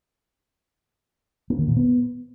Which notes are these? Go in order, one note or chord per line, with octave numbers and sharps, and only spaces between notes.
A#3
D#3
A#2
B3